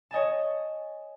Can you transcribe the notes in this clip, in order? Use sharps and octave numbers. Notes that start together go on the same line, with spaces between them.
C#5 D#5 G#5 A5